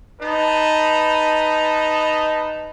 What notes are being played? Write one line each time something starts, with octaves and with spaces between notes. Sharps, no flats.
D#4 B4 A5